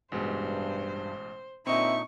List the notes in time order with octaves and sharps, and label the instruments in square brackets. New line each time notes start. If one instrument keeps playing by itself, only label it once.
[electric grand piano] A1 B2 G#3 [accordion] G2 [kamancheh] C5
[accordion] A#2 D3 D#4 [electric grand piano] C4 D#5 [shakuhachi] E5 [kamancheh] C#6